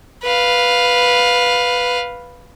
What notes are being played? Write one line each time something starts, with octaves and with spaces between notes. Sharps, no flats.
B4 F5